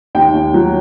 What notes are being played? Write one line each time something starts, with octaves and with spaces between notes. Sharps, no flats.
D#2 G5
D#2
F#3